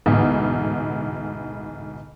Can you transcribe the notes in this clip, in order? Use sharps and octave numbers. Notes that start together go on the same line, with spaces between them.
A1 D2 G#2 B2